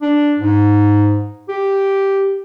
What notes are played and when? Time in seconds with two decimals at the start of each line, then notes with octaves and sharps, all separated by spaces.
0.02 D4
0.39 G#2
1.49 G4